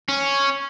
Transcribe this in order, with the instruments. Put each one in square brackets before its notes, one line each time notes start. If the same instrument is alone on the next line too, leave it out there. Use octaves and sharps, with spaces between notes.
[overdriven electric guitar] C#4